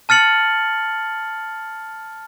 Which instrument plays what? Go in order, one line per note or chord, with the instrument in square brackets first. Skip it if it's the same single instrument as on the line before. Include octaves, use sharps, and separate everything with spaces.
[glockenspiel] A5 F6 A6 C#7 F#7